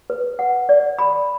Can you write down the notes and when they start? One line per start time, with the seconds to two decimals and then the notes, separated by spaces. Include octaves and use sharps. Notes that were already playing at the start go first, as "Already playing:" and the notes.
0.10 B4
0.39 F#5
0.69 D5
0.99 B5